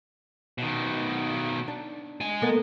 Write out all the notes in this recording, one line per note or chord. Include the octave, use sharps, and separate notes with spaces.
B2 D#3
D4
G#3 G#5
A#3 B3 A4